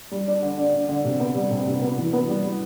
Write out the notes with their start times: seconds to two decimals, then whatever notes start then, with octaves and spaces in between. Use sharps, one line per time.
0.11 G3
0.27 D4
0.42 D3
0.57 D3
0.74 D3
0.89 D3
1.05 C3
1.20 B3
1.35 G3
1.51 C3
1.67 C3
1.82 B3
1.98 E3
2.13 B3
2.28 G3
2.43 G3